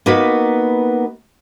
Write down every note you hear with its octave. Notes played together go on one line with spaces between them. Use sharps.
A#3 B3 D#4 F#4 B4